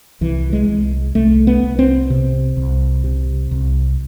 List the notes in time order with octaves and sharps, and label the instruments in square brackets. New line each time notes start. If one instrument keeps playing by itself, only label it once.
[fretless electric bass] C2 E3
G#3
C2
C2 A3
B3
C2
C4
C3
C2
C3
C2